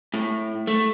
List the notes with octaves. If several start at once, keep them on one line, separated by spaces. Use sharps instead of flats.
A2
A3